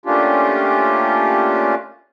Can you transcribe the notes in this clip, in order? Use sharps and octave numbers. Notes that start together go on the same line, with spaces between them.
A3 A#3 C#4 D4 F4 G4